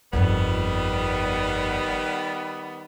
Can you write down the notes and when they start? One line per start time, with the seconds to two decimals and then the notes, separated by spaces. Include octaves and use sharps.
0.13 G1 F2 D#3 G3 B3